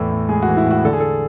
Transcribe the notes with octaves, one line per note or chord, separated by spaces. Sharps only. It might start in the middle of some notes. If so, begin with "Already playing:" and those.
Already playing: E2 A2 E3 A4
A2
G#3 G#4
F#4
E3
E4
A2 F#4
D3 A4
G#4
A4